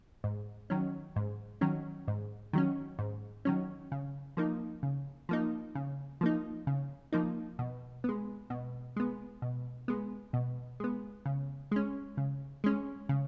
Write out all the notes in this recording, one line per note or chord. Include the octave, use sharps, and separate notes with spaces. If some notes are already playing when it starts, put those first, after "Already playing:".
G#2
D#3 F#3 C#4
G#2
D#3 F#3 C#4
G#2
D#3 F#3 C#4
G#2
D#3 F#3 C#4
C#3
F3 A#3 D#4
C#3
F3 A#3 D#4
C#3
F3 A#3 D#4
C#3
F3 A#3 D#4
B2
G#3 B3
B2
G#3 B3
B2
G#3 B3
B2
G#3 B3
C#3
G#3 C#4
C#3
G#3 C#4
C#3